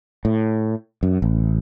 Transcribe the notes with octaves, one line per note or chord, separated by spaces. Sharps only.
A2
F#2
A1